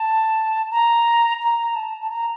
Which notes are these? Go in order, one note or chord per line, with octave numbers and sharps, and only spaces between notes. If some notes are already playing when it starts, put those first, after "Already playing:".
Already playing: A5
A#5
A#5
A5
A5
A#5